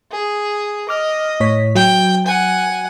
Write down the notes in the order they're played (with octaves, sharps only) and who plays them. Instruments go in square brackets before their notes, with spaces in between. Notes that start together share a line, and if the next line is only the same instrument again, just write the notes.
[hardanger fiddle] G#4
[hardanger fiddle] D#5 [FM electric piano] D6 F6
[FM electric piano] A2 C#5 B6
[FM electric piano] F#3 [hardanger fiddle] G5
[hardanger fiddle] F#5 G#5